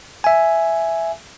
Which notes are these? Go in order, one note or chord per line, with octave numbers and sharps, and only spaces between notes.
E5 G#5